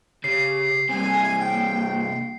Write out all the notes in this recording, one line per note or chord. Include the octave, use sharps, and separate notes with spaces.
C#3 G4 C7
G2 C3 G3 G#5
A#3 G5